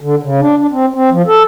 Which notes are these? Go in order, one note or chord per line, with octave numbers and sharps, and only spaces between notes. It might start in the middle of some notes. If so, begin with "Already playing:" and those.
D3
C#3
D4
D4
C4
C4
F3
A4